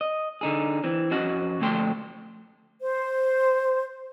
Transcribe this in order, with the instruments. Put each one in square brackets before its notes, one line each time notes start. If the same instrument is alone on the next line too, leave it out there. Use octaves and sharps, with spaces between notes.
[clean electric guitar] D#5
D3 D#4 G#4
E3 C4
F2 F3 C#4 F#4 D#5 F#5
D2 A#2 F3 A3 G5 C6
[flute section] C5